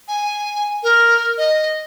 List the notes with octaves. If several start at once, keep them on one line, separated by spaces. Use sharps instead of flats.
G#5
A#4
D#5